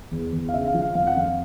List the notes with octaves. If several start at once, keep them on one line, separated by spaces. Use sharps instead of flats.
E2
E2
F5
C#3 E5
F5
F3
F5
F2 F5
F#5
F2 F5